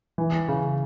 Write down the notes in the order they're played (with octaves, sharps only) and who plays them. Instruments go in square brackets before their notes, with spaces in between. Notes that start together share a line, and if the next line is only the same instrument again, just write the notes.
[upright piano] E3
C#3